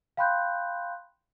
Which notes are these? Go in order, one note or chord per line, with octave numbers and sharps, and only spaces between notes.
F5 G5 B5 C6 F#6 G6